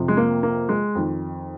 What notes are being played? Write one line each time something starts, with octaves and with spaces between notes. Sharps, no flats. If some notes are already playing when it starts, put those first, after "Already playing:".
Already playing: F2 C3 F3
G#3
A#3
A#3
G#3
F2 D#3